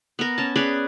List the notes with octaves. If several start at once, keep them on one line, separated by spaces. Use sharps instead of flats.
B3 A#4
C#4 A5
C#4 G#4 B4 D5